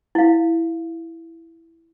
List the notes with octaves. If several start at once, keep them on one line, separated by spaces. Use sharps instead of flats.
E4 F5